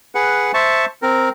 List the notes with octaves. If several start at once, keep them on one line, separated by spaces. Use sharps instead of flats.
G#4 B4 F#5
C5 E5 A5 C#6
C4 A#4